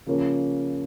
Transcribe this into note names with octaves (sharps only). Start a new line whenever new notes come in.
C#3 F3 A#3 C#4 F4